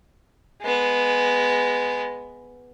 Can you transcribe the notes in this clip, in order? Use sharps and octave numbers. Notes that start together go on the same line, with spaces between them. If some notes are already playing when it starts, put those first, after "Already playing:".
G#3 B3